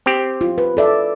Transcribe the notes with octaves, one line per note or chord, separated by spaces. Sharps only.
C4 G4
F4
B4
A4 D5 E5